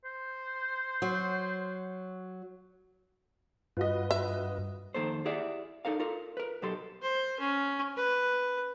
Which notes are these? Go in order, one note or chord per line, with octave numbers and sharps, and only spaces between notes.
C5
F#3
G2 F4 F#4 B4 D#5
E5
F2 D#3 A#3 A4 C5
E4 G4 G#4 D5 E5 F#5
D#4 A4 A#4 F5
F4 A4 A#4
A#4 B4
B1 F#3 G4 A4 C6
C5
C#4
B4